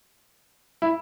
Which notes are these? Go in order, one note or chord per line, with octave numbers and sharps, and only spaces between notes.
E4